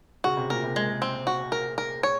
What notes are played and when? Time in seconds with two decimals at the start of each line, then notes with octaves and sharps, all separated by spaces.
0.24 C#3 F#4
0.37 C3
0.50 A#2 A#4
0.64 C3
0.76 G#3
1.02 C4
1.27 F#4
1.52 A#4
1.78 A#4
2.03 C#5